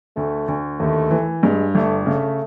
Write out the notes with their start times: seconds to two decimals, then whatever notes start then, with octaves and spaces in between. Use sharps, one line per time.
0.16 D2 A3
0.48 D2
0.80 D#2 A3
1.11 E3
1.43 G2 G#3
1.75 G1 A3
2.06 C#3 A3